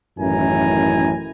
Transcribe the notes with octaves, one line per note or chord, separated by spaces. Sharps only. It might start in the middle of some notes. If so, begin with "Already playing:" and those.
A1 F#2 D#3 E4 G#5 A#5